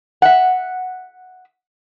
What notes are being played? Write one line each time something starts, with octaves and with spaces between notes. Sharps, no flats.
E5 F#5